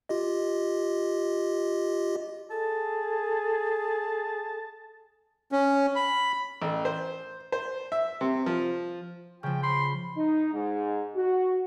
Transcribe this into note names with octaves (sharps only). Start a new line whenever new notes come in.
F4 G4 D#5
G#4 A4 A5
C#4
B5
A1
C5
C5
E5
C3
F3
C#3 F3 G5
B5 C6
D#4
G#2
F#4